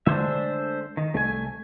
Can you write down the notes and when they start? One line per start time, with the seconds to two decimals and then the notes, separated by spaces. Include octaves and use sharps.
0.06 D3 G#3 A3 D4 C5 E5
0.97 D#3
1.14 C2 A3 G#5